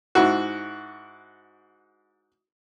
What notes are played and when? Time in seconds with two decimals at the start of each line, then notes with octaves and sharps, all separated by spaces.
0.15 G#2 E4 F#4